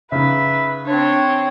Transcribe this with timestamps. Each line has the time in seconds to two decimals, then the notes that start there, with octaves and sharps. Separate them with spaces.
0.12 C#3 D#4 B4 E5
0.87 C4 D4 C#5